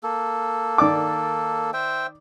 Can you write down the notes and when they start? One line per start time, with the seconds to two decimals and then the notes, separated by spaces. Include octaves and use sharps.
0.03 A#3 A4
0.78 D#3 D5 D6
1.73 C5 E5 G5